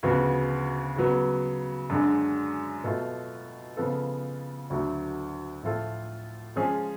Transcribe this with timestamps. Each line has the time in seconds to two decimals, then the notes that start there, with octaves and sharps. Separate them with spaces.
0.03 D2 C#3 F3 B3 F#4
0.96 C#3 F#3 B3
1.90 F#2 D3 G#3 D4
2.84 B2 A3 F4 A4
3.77 C#3 F3 B3 F4 A4
4.70 D2 D3 F#3 A3
5.62 A2 F3 A3 F4 A4
6.56 F3 G#3 C#4 G#4